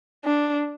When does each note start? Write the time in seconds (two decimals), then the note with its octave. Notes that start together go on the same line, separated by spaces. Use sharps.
0.25 D4